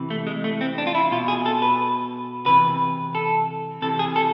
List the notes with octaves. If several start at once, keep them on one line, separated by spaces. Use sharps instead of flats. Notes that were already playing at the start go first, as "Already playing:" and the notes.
Already playing: C3 E3
A3
G#3
A3
C4
D4
F4
E4
B2 F4
G#4
A4
B4
C3 E3 B4
A4
C3 E3 A4
G#4
A4